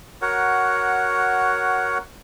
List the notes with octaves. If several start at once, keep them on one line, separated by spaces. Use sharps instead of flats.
F#4 A#4 C#5 F#5